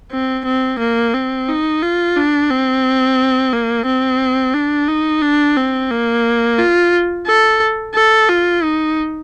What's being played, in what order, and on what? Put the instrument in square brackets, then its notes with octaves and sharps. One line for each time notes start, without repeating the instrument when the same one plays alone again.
[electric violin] C4
C4
A#3
C4
D#4
F4
D4
C4
A#3
C4
D4
D#4
D4
C4
A#3
F4
A4
A4
F4
D#4